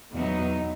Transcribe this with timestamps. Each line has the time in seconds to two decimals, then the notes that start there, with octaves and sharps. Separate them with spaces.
0.14 E2 B2 F#3 B3 D#4